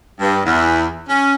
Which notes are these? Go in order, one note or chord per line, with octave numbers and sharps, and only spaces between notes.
G2
E2
C#4